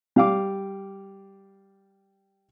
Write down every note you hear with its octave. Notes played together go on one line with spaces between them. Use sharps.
G3 F5 D6